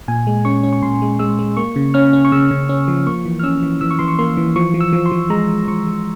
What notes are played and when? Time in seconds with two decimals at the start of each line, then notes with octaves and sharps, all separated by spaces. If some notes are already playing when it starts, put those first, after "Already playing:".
0.08 A#2 G#5
0.27 G#3
0.45 C#4 C#6
0.63 C#4
0.73 C#6
0.82 A#2 C6
1.02 G#3
1.19 G#3 E6
1.39 G#3
1.57 A#3 C#6
1.76 C#3
1.94 C#4 F6
2.13 C#4
2.25 C#6
2.32 C#3 E6
2.51 C#3
2.69 C#4
2.88 F3
3.06 A#3 C#6
3.26 E3
3.39 F6
3.43 C#4 E6
3.63 E3
3.81 E3 E6
3.91 C#6
3.99 E3 C6
4.08 C#6
4.19 A#3 C6
4.37 E3
4.56 F3 C#6
4.74 F3
4.81 E6
4.93 F3
5.06 C6
5.12 F3
5.30 G#3 A#5
5.49 F3
5.67 F3 C#6
5.87 F3